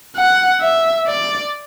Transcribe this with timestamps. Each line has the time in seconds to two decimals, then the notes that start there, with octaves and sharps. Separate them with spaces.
0.16 F#5
0.61 E5
1.07 D5